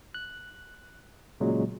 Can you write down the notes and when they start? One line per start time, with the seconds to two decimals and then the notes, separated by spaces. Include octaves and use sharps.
0.14 F#6
1.40 A#2 C#3 F#3 G#3